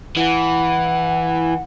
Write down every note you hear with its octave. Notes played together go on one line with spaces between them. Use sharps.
E3 F#5